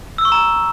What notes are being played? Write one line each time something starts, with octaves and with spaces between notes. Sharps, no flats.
E6
C#6
A#5